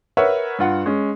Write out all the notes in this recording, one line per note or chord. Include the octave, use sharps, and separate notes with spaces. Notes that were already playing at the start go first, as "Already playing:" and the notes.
A#4 B4 C#5 E5 F#5
G2 F4 F#5
G#3 C#4